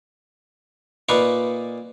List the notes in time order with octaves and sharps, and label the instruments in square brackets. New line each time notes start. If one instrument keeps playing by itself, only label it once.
[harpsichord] A#2 D#4 B4 F5 C#6 D6